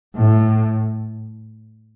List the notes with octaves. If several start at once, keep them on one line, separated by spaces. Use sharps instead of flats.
A2